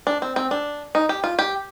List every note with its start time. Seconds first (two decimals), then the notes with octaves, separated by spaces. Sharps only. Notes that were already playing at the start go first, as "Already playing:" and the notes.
0.07 D4
0.22 C4
0.36 C4
0.51 D4
0.95 D#4
1.09 G4
1.24 F4
1.39 G4